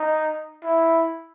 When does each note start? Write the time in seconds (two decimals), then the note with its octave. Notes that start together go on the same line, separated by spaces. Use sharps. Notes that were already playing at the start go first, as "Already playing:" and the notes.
Already playing: D#4
0.64 E4